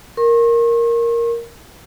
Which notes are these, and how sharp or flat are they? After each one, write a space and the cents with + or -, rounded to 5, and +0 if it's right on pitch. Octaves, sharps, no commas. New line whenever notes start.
A#4 +0 C#6 -45